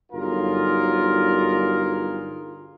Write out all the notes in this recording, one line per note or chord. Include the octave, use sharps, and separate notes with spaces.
G1 F#3 D#4 F4 G#4 A#4